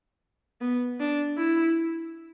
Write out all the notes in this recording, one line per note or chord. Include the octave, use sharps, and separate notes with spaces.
B3
D4
E4